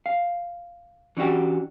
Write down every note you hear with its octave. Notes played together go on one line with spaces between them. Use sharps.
F5
E3 C#4 D4 F#4 G4